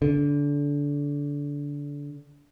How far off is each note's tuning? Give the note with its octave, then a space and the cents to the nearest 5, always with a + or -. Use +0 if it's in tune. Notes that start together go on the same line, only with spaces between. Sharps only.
D3 -25